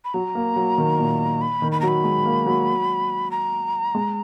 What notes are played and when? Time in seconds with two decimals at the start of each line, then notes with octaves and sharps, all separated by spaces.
0.05 B5
0.14 F#3 A#5
0.35 A#3
0.56 F#3
0.78 D#3
0.99 A#2
1.41 B5
1.62 D#3
1.72 B5
1.81 F#3 A#5
1.88 B5
2.04 G#3
2.25 A#3
2.46 F#3
3.31 A#5
3.95 G#3